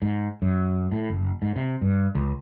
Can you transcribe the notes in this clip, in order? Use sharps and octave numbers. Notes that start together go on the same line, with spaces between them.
G#2
F#2
A2
F#1
G#2
C3
G2
C#2